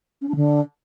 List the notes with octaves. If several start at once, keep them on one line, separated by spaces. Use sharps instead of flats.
C#4
D4
D3